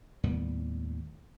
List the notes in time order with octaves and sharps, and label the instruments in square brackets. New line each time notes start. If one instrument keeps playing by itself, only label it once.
[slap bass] D#2 A2 G3 B3